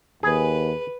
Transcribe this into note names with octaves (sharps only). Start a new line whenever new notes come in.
D#2 G#4 B4